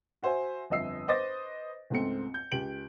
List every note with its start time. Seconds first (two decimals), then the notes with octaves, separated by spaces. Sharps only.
0.22 F#4 C5 E5 G#5
0.70 G1 F2 D#5 E5 E6 C7
1.08 B4 C5 D#5 D6 A6 A#6
1.90 C#2 G#2 A3 C4 C#7
2.34 G6
2.51 C#2 G4 D7 F#7